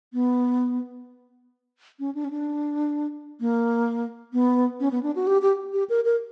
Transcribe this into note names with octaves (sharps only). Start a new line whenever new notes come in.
B3
C#4
D4
C#4
D4
A#3
B3
C#4
B3
D4
F#4
G4
G4
G4
A#4
A#4